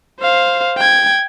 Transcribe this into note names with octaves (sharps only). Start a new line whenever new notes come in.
C5 F5
G5 G#6